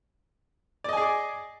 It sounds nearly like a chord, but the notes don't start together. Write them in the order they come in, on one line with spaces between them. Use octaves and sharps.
D5 D#5 G#5 G#4 D6